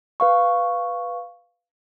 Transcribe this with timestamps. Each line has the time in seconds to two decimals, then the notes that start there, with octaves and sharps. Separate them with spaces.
0.20 B4 F5 C#6